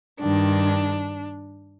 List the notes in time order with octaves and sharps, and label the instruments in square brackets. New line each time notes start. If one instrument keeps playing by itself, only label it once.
[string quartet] G2 D#3 D4